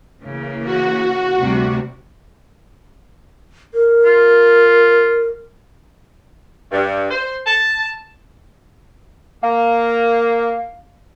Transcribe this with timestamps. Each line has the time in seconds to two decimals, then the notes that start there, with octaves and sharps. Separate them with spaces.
0.21 C#3 E3 A#3
0.65 F#4
1.40 D2 C3 G3
3.74 A#4
4.05 F4
6.71 G2
7.10 C5
7.45 A5
9.43 A#3 F5